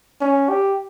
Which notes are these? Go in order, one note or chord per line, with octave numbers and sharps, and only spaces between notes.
C#4
G4